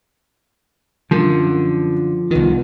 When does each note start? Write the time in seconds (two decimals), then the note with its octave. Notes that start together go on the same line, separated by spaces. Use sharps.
1.11 F#2 D3 F3 A#4
2.31 C2 D#3 B3 F4